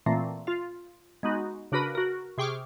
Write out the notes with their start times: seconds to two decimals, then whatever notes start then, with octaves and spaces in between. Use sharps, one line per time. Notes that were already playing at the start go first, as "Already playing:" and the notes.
0.06 A#2 E3 A3 A#3 C4
0.47 F4 F5
1.23 G#3 B3 D#4 F#4
1.72 C#3 D4 F#4 A#4 B4 B5
1.95 F#4 A#4
2.38 C3 G#4 G5 C#6 D6 F6